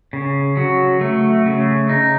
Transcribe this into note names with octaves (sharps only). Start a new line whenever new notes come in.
C#3
F#3
A3
C#3
D#4